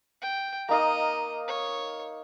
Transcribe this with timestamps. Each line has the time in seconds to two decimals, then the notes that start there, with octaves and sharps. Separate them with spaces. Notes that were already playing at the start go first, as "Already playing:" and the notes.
0.22 G5
0.69 A#3 D#4 D#5 F5 A#5
1.48 C#5